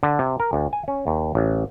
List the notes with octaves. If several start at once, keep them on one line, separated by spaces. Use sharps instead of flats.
D3
C3
A#4
D2
G#5
C#4
D#2
A1